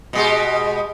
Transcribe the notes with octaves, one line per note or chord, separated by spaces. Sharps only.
B2 G#3 G4